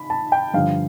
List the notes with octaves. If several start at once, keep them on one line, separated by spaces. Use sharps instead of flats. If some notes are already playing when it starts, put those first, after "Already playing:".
Already playing: B5
A5
G5
G2 D3 F3 F5